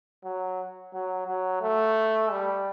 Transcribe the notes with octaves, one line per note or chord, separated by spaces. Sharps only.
F#3
F#3
F#3
A3
G3